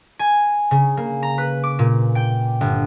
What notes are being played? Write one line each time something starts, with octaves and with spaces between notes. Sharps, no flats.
G#5
C#3
A#3
A#5
B4
D6
A#2
G5
G1